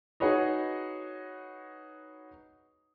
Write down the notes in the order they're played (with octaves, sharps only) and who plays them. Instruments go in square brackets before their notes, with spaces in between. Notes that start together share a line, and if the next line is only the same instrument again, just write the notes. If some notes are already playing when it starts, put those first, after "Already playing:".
[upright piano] D#4 F#4 G#4 B4 C#5 D#5